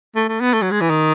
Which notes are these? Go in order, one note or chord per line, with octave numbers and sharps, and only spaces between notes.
A3
A3
B3
A3
F#3
G#3
E3
D#3